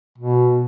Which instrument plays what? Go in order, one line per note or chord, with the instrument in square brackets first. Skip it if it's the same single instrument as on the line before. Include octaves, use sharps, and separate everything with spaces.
[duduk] B2